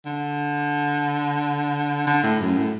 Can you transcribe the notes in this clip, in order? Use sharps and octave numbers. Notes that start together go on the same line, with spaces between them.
D3
D3
A2
F#2
A2